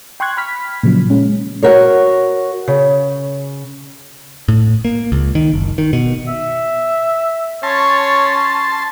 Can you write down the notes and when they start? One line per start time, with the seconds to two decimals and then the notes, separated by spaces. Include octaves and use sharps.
0.20 G5 C6 C#6 F#6 G#6
0.37 B5 F6 B6
0.83 A#2 C#3 F3 F#3
1.10 G#3 C#4
1.63 F#4 A#4 C#5
2.68 C#3
4.48 A2
4.85 A#3
5.12 C#2
5.35 D#3
5.54 F#1
5.78 D#3
5.93 B2
6.28 E5
7.63 C#4 C#5 A5 C6